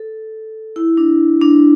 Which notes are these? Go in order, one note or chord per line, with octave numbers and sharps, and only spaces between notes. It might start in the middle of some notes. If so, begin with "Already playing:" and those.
Already playing: A4
E4
D4
D4